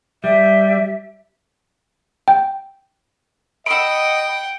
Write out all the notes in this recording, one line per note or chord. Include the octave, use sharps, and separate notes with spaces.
G3 E5
G5
D#5 F#5 G5 B5 E6 D7